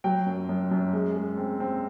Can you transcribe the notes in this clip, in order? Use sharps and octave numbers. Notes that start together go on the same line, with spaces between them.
F#3 G5
F#2
F#2
F#2
G#3
G#3
C4
C4